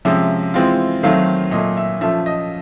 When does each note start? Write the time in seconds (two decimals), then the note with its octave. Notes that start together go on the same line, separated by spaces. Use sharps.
0.05 C3 F3 G#3 C#4 E5
0.54 E3 G#3 C4 F4
1.03 D#3 F#3 A3 C4 F5
1.51 A#2 F#3 A3 D#5
1.77 E5
2.01 F3 A3 C#4 F4 E5
2.26 D#5